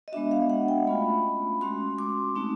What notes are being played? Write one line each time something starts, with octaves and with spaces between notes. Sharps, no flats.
D#5
G#3 B3 D4 F#4 E5
F5
F#5
G5
A3 C#4 F4 B5
G#3 C#4 F#4 C6
D6
A3 C4 D#4 F#4